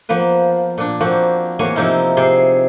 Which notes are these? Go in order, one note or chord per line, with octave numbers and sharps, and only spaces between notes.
F3 A#3 B3 B4
A#2 D4
F3 A#3 C4 F#4
E2 A#3 B3 C#5 F5 G#5
C3 F3 D#4 E4 F5
C3 G#4 C6